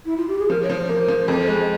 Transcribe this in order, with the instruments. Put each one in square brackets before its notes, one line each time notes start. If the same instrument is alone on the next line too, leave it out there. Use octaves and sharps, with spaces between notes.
[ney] E4
F4
G4
G#4
[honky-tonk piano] F3 [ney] A#4
[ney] C#5
[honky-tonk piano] F3
[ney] C5
[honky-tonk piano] A#3
F3
F2
G#3